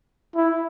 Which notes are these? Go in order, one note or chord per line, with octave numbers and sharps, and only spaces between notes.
E4